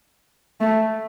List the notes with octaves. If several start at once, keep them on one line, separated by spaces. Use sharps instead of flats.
A3